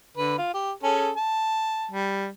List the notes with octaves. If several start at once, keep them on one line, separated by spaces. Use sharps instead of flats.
D3 B4
F4
G4
C#4 G#4 A4
A5
G3